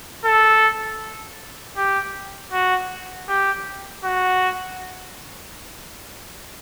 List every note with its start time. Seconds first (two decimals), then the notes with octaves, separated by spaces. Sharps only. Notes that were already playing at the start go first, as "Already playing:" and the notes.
0.25 A4
1.77 G4
2.52 F#4
3.28 G4
4.04 F#4